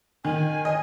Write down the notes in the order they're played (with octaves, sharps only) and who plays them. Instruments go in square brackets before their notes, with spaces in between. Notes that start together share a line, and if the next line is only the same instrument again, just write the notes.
[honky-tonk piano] D#3 [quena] G#5
[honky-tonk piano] D#5